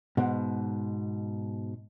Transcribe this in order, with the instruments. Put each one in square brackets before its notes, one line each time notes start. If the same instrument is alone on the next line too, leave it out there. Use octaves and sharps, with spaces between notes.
[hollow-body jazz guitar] G#2 B2